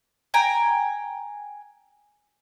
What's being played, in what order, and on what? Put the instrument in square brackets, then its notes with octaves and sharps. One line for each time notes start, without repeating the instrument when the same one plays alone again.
[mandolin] G5 G#5 A#5